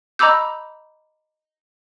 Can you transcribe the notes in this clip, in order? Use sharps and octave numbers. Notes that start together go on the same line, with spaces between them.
D#5 A#5 B5 D6 E6 G6